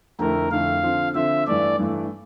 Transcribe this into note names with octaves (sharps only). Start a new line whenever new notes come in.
F2 D3 A3 E4 A#4
F2 D3 A3 E4 F5
D3 F3 C4
D3 F3 C4 E5
G2 E3 A3 D5
G2 E3 A3